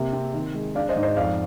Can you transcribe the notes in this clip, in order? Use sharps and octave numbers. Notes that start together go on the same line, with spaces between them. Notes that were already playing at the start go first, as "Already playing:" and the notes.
Already playing: C3 A#3
C4
D#3
G#3
D4 D5 F5
C5 D#5
G#2
C5 D#5
F2 D5 F5